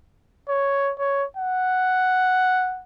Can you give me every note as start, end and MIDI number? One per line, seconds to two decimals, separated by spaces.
0.49 0.93 73
0.99 1.25 73
1.37 2.83 78